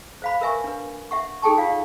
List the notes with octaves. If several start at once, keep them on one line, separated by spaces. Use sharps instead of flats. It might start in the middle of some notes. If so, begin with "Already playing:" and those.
C5 F5 B5
A#4 B4 E5 G#5 C#6
D4 B4
E5 F#5 C#6
D#4 G#4 A4 G5 A5 C#6
F4 D5 F5 F#5